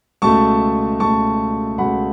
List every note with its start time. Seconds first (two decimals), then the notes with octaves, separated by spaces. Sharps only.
0.22 C#2 B2 A3 A5 C#6
1.00 C#2 B2 A3 A5 C#6
1.78 C#2 B2 A3 F#5 B5